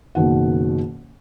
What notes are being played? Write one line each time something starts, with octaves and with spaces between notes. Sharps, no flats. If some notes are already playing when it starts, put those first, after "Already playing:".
F#1 B2 D#3 F#5